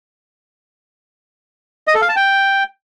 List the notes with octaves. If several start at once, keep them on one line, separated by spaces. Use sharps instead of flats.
D#5
A4
F5
A5
G5